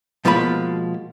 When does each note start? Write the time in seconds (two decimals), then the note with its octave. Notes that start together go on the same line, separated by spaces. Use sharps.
0.25 B2 F3 G#3 A#3 F4 B5